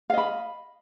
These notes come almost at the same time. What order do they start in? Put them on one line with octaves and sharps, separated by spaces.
F5 D#5 B5